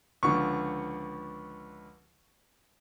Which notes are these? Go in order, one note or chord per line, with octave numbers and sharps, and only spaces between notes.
C#2 D3 F3 C#6